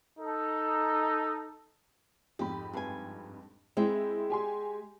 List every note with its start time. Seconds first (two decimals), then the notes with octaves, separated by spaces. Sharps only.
0.19 D#4 A4
2.39 F2 G#2 G4 B5
2.73 G2 G#5
3.77 G#3 C4 E4
4.30 G4 G#5 C6